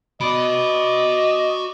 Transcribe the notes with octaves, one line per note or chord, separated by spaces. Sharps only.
F#4 D5 D#5 B5